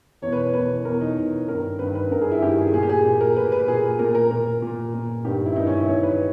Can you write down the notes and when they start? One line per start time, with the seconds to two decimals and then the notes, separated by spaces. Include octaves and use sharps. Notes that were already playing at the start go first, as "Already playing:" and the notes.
0.22 E2 B2 C#5
0.32 B4
0.43 B4
0.53 E2 B2 B4
0.85 E2 B2 A#4
1.01 D#4
1.16 E2 B2
1.48 G2 D#3 A#4
1.79 G2 D#3 B4
1.95 B4
2.11 G2 D#3 A#4
2.21 G#4
2.32 E4
2.42 G2 D#3 G4
2.58 G#4
2.73 A#2 G#4
2.83 G4
2.89 G#4
3.05 A#2
3.21 A#4
3.36 A#2 B4
3.52 B4
3.68 A#2 G#4
3.99 A#2 A#4
4.15 A#4
4.31 A#2 A#4
4.62 A#2
4.94 A#2
5.24 G2 D#3 G4
5.46 E4
5.56 G2 D#3 D#4
5.67 C#4
5.77 E4
5.88 G2 D#3 C#5
6.03 B4